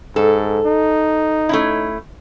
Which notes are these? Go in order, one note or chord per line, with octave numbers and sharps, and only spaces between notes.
G#2 A4
D#4
A3 C#4 E4